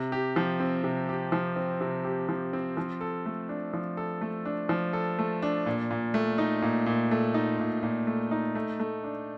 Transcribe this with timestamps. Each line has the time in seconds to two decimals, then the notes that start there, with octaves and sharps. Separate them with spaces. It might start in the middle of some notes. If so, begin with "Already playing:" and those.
Already playing: C3
0.12 G4
0.36 F3
0.60 C4
0.84 C3
1.09 G4
1.32 F3
1.56 C4
1.81 C3
2.05 G4
2.29 F3
2.53 C4
2.77 F3
3.01 A4
3.26 A3
3.49 D4
3.73 F3
3.97 A4
4.21 A3
4.45 D4
4.69 F3
4.93 A4
5.19 A3
5.42 D4
5.66 A#2
5.91 A#2
6.14 A3
6.38 D#4
6.62 A#2
6.86 A#2
7.11 A3
7.34 D#4
7.59 A#2
7.83 A#2
8.07 A3
8.31 D#4
8.55 A3
8.80 A3
9.04 D4